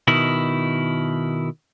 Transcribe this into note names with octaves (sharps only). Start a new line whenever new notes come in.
B2 D#3 E4